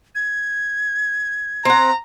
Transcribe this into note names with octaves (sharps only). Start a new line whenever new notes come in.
G#6
C4 F#5 A#5